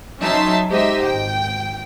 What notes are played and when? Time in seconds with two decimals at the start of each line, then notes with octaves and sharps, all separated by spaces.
0.21 F#3 C#4 D#4 E5 A5 C6
0.70 G#3 D#4 G4 C5 D#5 E5
1.04 G#1 G5